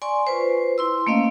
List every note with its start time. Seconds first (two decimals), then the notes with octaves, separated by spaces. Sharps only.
0.02 D5 G#5 C6 C#6
0.27 F4 B4 C5
0.78 E4 C6 E6
1.07 A3 A#3 C#4 D#5 F5